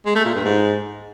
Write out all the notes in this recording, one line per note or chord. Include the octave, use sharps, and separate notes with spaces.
G#3
A3
A#2
G2
G#2